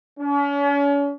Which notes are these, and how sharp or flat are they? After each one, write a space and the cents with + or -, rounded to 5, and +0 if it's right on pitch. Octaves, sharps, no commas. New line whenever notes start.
C#4 +40